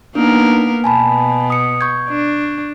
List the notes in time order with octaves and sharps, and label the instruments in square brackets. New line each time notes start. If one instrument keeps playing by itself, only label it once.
[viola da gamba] A#3 B3 A#4 [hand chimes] D4 D#4
[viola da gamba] B2 [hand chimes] G#5 A5 B5
[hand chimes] D#6 C#7
C#6 G6 G#6
[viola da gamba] D4